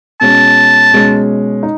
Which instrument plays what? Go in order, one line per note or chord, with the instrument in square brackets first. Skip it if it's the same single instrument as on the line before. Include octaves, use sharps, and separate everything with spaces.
[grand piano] B2 G#3 C#4 [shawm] A5
[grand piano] B2 G#3 C#4
D#4